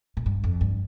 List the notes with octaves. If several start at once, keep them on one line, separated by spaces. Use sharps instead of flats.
A2
G2
F2
G2